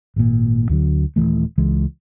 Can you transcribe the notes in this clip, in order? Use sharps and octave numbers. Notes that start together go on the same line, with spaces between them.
G#1 A#2
D2 D3 F#3
D#1 F2 E3 A3
C#2 E3 G#3